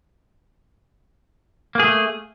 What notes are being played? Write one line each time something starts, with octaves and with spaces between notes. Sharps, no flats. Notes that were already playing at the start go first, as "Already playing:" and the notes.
A3 A#3 G#4